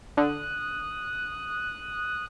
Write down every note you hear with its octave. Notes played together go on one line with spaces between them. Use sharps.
D3 D#6 F#6